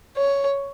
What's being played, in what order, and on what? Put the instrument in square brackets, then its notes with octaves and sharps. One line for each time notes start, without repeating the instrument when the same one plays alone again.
[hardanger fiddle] C#5